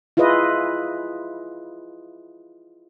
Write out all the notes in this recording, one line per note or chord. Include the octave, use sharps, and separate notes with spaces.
E4 F4 G#4 B4 D#5